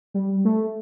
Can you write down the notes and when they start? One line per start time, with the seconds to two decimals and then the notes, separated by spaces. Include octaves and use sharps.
0.14 G3
0.45 A3